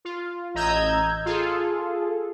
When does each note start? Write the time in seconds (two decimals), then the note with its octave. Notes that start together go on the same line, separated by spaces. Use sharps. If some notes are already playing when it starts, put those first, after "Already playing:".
0.05 F4
0.54 A1 D#5 A#5 E6 G6 G#6
1.26 F4 G#4 A4